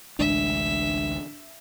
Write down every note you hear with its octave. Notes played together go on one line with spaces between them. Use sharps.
A1 D2 G#3 D4 E5